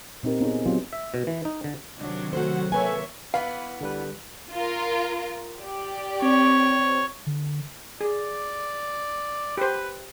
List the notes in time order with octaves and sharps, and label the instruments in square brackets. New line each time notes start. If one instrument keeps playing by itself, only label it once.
[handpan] A#2 C4 D#4 G4 A#4
B3 C#4 D#4 F4 G#4
F#3 B3 C4 F4 G4
[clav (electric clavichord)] E5
B2
E3
D#4
D3
[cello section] C3 D#3 F#3 [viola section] D4
[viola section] A3 F#5 [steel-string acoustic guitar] F#4 C5
[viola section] A#3 C#5 E5 [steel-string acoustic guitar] A4 B4 G#5
[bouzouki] E3 B3 [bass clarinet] B4 [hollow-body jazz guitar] F5
[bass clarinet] C2 [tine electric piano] D3 G3 B4
[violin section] F4 A#4
G4 D5
[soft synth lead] C4 [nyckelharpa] C#5
[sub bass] D3
[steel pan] G#4 [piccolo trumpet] D5
[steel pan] G4 C5 [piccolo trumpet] B4